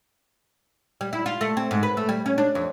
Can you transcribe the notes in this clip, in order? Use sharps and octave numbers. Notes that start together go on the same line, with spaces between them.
G3
E4
F4
A3
C4
G#2
B4
A3
G3
C#4
D4
F2